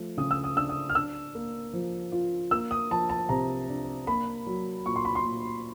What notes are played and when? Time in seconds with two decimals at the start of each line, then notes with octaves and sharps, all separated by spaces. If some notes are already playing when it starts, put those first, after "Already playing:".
Already playing: F3 A3
0.17 C#3 D#6
0.31 E6
0.44 D#6
0.57 D4 E6
0.69 D#6
0.89 F6
0.95 D4 E6
1.35 A#3
1.73 F3
2.12 F4
2.51 A#3 E6
2.71 D#6
2.91 F3 A5
3.09 A5
3.29 C3 A#5
3.69 D4
4.07 A#3 B5
4.47 F#3
4.86 A#2 C#6
4.96 C6
5.05 B5
5.15 C6
5.25 A#2